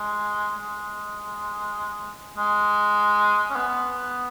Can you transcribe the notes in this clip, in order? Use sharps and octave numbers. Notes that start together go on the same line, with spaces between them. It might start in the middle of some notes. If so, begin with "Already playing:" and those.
Already playing: G#3
G#3
G#3
C#4
B3